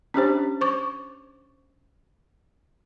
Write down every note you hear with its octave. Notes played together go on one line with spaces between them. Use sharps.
C#4 D4 G4 C5
C5 C#6 D6